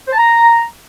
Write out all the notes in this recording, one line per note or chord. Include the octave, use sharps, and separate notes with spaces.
C5
A5
A#5